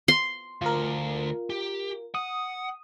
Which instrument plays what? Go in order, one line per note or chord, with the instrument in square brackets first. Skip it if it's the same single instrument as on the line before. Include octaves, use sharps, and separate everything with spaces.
[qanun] C6
[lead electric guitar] D2 [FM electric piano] F4 A#4
[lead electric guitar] G4
[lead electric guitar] F#5 [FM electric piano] D#6